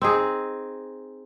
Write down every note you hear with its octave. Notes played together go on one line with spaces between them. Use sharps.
C4 D#4 G#4